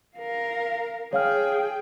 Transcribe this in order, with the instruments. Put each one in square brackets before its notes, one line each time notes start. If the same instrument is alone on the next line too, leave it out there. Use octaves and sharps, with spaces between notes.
[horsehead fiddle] A#4 F5
[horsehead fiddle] G#4 G5 [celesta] C#5 F5 F6